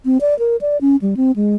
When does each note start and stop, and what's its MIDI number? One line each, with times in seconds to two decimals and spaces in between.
0.05 0.18 60
0.21 0.37 74
0.39 0.56 70
0.61 0.78 74
0.81 0.96 61
1.02 1.15 55
1.17 1.32 60
1.36 1.56 56